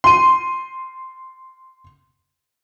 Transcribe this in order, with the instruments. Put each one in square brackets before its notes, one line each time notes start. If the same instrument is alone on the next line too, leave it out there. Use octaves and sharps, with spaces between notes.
[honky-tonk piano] C6 D#7